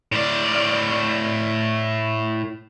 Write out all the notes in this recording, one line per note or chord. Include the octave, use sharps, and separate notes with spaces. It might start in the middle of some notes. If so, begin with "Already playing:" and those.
A2 D5